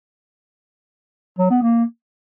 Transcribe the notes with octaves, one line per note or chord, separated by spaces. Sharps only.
F#3
B3
A#3